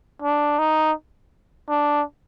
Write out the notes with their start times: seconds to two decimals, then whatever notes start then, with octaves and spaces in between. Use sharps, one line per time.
0.22 D4
0.59 D#4
1.69 D4